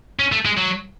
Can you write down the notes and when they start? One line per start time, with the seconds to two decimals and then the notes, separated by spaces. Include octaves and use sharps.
0.19 C#4
0.32 A3
0.45 G#3
0.57 F#3